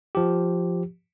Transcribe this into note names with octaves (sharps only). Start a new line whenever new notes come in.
F3 G4